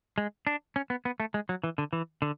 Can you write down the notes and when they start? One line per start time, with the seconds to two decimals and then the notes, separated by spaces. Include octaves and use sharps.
0.18 G#3
0.47 D4
0.76 C#4
0.90 B3
1.05 B3
1.20 A3
1.34 G#3
1.49 F#3
1.64 E3
1.78 D3
1.93 E3
2.22 D3